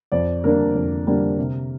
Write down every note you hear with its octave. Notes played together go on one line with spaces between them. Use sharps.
F2 D5
D3 G3 A#3 D4 A#4
F2
D3 G3 A#3 D4
C3